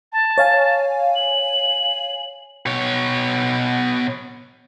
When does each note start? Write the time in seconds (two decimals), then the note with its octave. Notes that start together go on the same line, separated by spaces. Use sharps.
0.12 A5
0.38 C#5 F5 G#5
1.15 F#7
2.67 B2 C#5